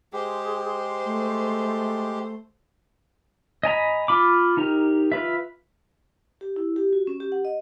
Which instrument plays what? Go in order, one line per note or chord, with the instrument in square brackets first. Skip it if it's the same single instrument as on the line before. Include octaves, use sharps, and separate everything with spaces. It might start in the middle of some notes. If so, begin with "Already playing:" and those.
[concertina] G#3 G4 [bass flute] G#4 [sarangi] C5
[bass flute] A3
[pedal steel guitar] D#5 G#5 A#5 B5
F4 B5 D6
D#4 G4 A#4
F4 B4 E5
[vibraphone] G4
E4
G4
F#4
C#4
G4
F#5
D#5